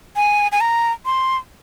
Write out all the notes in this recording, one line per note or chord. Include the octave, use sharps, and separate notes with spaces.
G#5
G#5
A#5
C6